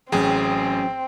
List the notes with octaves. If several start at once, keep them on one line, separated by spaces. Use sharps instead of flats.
A1 F#3 C4 C#4 G#4 G5